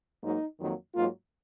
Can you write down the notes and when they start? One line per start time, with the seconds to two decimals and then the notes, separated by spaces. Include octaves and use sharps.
0.23 G#2 F#3 A#3 D#4
0.59 F2 D#3 F#3 A#3
0.94 G#2 F#3 A#3 F4